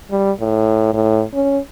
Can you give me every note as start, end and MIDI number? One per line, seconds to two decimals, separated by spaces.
0.11 0.32 55
0.40 0.90 45
0.94 1.23 45
1.34 1.59 61